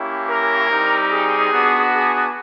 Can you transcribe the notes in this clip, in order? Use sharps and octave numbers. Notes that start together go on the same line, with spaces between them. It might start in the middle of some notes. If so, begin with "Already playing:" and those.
Already playing: A#3 C#4 E4 G4
A#4
G3 C4 D#4 G4
G#4
B3 D4 F#4
G#4